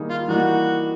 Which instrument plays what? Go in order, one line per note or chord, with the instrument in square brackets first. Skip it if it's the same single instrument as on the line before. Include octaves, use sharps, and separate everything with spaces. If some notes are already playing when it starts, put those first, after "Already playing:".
Already playing: [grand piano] D#3 G3 A#3 D#4 G#4
[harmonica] F4
[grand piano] E3 G3 A#3 D#4 [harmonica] F#4